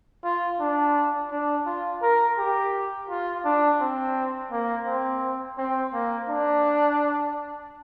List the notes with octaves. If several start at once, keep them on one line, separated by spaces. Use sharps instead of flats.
F4
D4
D4
F4
A#4
G4
F4
D4
C4
A#3
C4
C4
A#3
D4